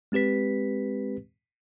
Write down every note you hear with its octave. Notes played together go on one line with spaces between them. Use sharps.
G#3 C4 G4 B4 B6